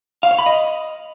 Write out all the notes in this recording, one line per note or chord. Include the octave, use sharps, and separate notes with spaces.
F5
C#5
B5
D#5